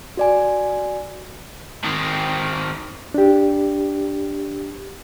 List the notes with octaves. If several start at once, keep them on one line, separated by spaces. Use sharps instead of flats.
F#4 D5 G#5
D#3 C4
D4 G4